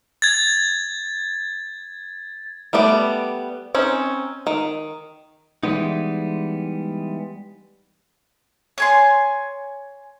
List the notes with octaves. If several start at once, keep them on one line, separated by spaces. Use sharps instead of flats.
G#6 A6
G3 A3 B3 D5
C4 C#4 D#4
D#3
E3 G3 G#3 B3 D#4
C#5 G#5 C6